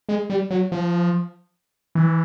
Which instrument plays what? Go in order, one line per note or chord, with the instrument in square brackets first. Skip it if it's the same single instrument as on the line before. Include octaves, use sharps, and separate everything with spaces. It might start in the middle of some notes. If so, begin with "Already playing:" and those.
[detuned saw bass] G#3
G3
F#3
F3
E3